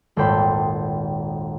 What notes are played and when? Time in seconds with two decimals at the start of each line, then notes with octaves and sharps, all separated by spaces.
0.16 D#1 G#1 A4 C5 G5 B5